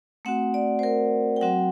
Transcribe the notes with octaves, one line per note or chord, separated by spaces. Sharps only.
A3 C4 F#4 F#5
D5
C5
A#4
G5
F#3 C4 F#4 F#5